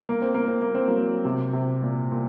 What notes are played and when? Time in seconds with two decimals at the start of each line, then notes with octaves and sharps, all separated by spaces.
0.09 A#3
0.22 C4
0.34 A#3
0.48 C4
0.62 A#3
0.75 C4
0.88 F#3 A#3
1.25 C3
1.53 C3
1.83 A#2
2.12 A#2